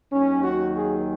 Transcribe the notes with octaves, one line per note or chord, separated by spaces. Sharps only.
D#2 D#3 F#3 C#4
F#4
G#4